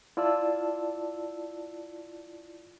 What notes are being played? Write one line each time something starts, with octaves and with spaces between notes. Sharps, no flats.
E4 F4 D5 A5 E6